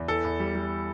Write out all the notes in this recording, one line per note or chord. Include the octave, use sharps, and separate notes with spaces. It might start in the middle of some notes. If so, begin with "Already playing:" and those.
Already playing: E2
E3 A4
E2
G3
G3